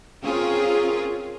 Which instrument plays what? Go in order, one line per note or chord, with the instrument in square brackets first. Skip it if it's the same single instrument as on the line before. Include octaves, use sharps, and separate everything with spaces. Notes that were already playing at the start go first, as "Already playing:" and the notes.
[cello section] C4 C#4 F4 G#4 A#4